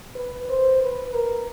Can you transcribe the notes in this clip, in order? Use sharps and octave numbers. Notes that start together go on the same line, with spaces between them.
B4
C5
B4
A#4